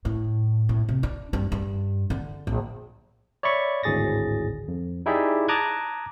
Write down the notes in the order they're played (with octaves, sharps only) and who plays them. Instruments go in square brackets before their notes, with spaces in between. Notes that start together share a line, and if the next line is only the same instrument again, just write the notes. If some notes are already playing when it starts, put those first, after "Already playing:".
[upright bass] A2
A2
C3
D4
G2
G2
D3
A#1
[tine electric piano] C#5 D5 E5 B5 C#6
G#1 D2 A2 G#4 A6 A#6
F2
D#4 E4 G4 G#4 D5 E5
A5 A#5 D6 D#6 F#6 G#6